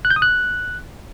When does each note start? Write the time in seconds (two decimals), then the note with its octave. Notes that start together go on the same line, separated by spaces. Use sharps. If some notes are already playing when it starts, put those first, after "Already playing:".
0.05 F#6
0.10 G6
0.16 D#6
0.22 F#6